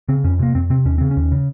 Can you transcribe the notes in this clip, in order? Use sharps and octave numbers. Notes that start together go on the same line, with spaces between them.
C#3 C4
F2 C#4
C3 A#3
F2 C4
C3 C4
D#2 C#4
C#3 C4
C#4
D#2
C#3